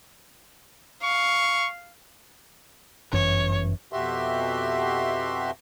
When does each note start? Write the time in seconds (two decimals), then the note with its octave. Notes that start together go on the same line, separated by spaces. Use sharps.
1.03 F5 C#6
3.12 G1 F#2 E3 C#5
3.93 F2 B2 F#4 G4 E5 C6